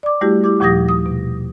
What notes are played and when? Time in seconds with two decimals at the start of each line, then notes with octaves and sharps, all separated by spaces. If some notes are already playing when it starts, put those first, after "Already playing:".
0.03 D5 D6
0.21 G3 A3 E4 F#4 G4
0.44 E4 G4 D6
0.60 D#2 A#2 F3 G4 D#6 A#6
0.89 D#6
1.06 B2